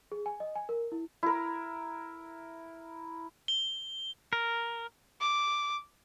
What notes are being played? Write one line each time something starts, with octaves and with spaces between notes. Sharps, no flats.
G#4
G#5
D#5
G#5
A#4
E4
E4 A#4
G7
A#4
D6